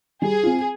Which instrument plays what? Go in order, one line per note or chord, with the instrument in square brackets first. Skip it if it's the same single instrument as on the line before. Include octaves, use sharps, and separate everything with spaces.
[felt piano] G3 [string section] G#4
[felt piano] C4 F4